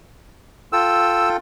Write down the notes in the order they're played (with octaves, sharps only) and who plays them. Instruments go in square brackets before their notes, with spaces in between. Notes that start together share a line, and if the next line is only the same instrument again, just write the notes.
[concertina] F4 A4 G5 [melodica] E6